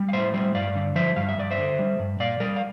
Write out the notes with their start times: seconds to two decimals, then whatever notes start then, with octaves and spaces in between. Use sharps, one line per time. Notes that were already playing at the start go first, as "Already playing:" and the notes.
Already playing: G3
0.09 F5
0.13 A2 C5 E5
0.34 G3 C5 E5
0.55 G2 D5 F5
0.75 D3
0.95 F3 C5 E5
1.16 G2 F5
1.29 E5
1.38 G2 D5
1.51 C5 E5
1.58 D3
1.79 G3
1.99 G2
2.20 A#2 D5 F5
2.40 G3 A#4 D5
2.56 F5